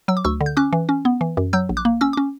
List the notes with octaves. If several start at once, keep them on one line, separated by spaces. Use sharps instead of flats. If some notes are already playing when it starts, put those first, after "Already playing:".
F#3 E6
D6
D2 C#6 E6
D3
G6
C#4 D6 F#6
E3
C#4
B3
E3
F#2
F#3 E6 G6
A#1
D6 F#6
A#3
C#4 E6
C#4 D6